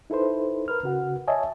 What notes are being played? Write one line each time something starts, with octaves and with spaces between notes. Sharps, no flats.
D#4 E4 A4 B4 C5
A#4 B4 F6
C#3 F#4 F#5
C#5 D#5 E5 G#5 A5